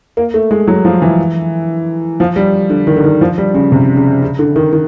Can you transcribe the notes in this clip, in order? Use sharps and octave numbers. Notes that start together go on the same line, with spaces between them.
A#3
A3
G#3
F#3
F3
E3
F3
G3
D3
D#3
D3
D#3
F3
G3
C#3
C3
C#3
C#3
D3
D#3
D#3